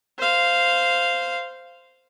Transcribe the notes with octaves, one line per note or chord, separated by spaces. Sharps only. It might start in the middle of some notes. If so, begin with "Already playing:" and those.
C5 F5